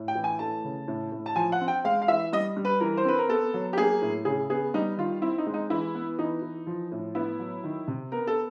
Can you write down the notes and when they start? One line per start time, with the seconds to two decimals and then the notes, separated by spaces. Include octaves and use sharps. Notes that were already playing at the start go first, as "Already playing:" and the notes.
Already playing: A2
0.08 G5
0.15 E3
0.24 G#5
0.39 A3 A5
0.64 C#3
0.88 A2
1.12 A2
1.26 A5
1.36 F3 G#5
1.52 F#5
1.61 C4
1.68 G5
1.84 G#3 F5
2.02 F5
2.08 E3 E5
2.33 G3 D#5
2.56 G3
2.65 B4
2.80 E3 A#4
2.97 C5
3.05 C4 B4
3.18 A#4
3.29 B3 A4
3.54 F#3
3.73 G4
3.77 A#3 G#4
4.02 A2
4.25 C#3 G#4
4.50 B3 G#4
4.74 G3 D#4
4.97 D#3 F4
5.22 C4 E4
5.38 D#4
5.46 G#3
5.54 D#4
5.70 E3 E4
5.95 B3
6.19 E3 D#4
6.42 E3
6.67 F3
6.91 A2
7.15 B3 E4
7.40 F#3
7.64 D#3
7.88 C3
8.12 B3 A#4
8.27 A4